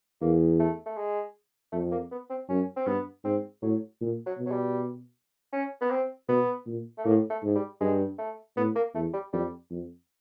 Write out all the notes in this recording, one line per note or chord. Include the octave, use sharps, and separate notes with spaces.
E2 A#3
A3
A3
G#3
F2 A3
A#3
B3
C4
F#2 C#4
C4
G2 B3
G#2 C4
A2 F#3
A#2
F#3
B2
F#3
G3
C#4
B3
C4
B2 B3
A#2
A3
A2 A#3
A3
G#2
G3
G2 G#3
A3
A2 B3
A#3
E2 A3
G3
F2 G3
F2